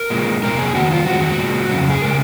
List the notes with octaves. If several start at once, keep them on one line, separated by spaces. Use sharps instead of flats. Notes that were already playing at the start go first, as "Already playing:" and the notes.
Already playing: A#4
A#2 G#3
F2 C3 F3 A#3 A#4
G#4
F2 D#3 A#3 F#4
F4
F2 D#3 G#3 F#4
F#4
A#2 G#3
F2 C#3 F#3
G#4
C#3 G#3 A#4